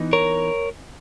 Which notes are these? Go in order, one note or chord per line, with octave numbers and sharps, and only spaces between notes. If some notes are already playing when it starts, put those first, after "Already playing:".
Already playing: E3 B3 D#4
A#4 C#5